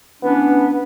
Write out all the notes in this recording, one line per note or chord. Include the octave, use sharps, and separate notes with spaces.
E3 B3 C#4 D4